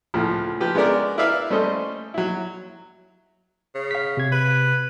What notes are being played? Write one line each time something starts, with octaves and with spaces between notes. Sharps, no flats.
C#2 A2 F3
F3 G4 B4
G#3 B3 C#4 D4 A#4 D5
E4 A#4 B4 D5 E5 F5
G3 A3 C#4 A4 C5 D#5
F#3 E4
C#3
F5 B6
C3 G#6
B4